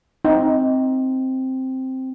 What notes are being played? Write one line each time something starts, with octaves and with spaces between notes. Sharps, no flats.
C4 D#4